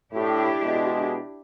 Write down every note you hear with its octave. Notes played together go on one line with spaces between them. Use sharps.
A2 D4 E4 G4
B2 G#3